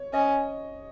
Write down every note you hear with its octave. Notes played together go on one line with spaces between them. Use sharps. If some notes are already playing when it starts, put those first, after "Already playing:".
Already playing: C#5
C#4 D#5